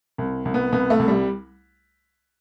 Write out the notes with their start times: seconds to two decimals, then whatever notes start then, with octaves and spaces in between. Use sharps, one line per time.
0.18 C2
0.45 C2
0.54 B3
0.72 C2 B3
0.90 A3
0.99 C2
1.08 G3